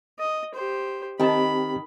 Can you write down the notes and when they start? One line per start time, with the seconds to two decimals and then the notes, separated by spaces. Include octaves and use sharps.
0.19 D#5
0.55 G4 C5
1.20 D#3 C4 G4 A5 B5